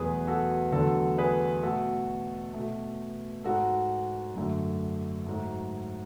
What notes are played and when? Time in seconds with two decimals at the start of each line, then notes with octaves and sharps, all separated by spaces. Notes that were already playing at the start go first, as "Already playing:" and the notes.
Already playing: E2 B2 F#3 A3 G#4 B4
0.27 F#4 A4
0.72 E2 D3 F#3 A3 F#4 A4
1.18 G#4 B4
1.63 B2 A3 F#4 A4
2.54 B2 A3
3.44 G#2 G#3 F#4 A4
4.35 F#2 D3 A3
5.26 G#2 F#3 A3